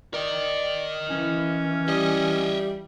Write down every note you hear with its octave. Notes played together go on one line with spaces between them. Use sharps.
A#4 D5 D#5
E3 C#4
G3 D#5 E5